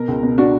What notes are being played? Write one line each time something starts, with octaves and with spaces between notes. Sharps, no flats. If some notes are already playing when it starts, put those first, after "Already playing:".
Already playing: B2 A#4
C#2
B2
B2 D4 F#4